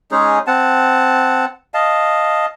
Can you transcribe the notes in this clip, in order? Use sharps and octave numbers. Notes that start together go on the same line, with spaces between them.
G#3 C#4 D#4 G#4
C4 F#5 A5
D#5 F5 A5